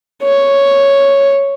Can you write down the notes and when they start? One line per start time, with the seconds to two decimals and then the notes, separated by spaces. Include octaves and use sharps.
0.23 C#5